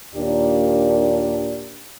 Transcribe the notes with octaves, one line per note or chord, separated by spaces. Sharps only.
D#2 A#2 A#3 D4 G4 D5